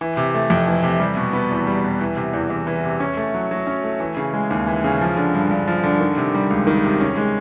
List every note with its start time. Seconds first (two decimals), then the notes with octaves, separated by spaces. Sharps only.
0.01 E3
0.17 C3
0.34 A3
0.50 F2
0.67 E3
0.83 C3
1.00 G3
1.17 B2
1.33 B3
1.51 E2
1.67 G3
1.84 B2
2.01 E3
2.17 C3
2.33 E2
2.50 E2
2.67 E3
2.84 C3
3.00 C#4
3.17 A3
3.35 F#3
3.51 F#3
3.67 C#4
3.84 A3
4.00 E3
4.17 C#3
4.34 G#3
4.50 D#2
4.67 E3
4.84 C#3
5.01 F3
5.17 D3
5.34 G2
5.51 G2
5.68 F3
5.83 D3
6.00 D#3
6.17 C3
6.34 G3
6.50 C#2
6.67 D#3
6.84 C3
7.00 C#4
7.17 G#3